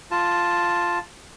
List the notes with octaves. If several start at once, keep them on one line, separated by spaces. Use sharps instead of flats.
F4 A5